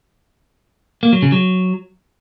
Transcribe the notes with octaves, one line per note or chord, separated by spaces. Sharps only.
A#3
F#3
C#3
F#3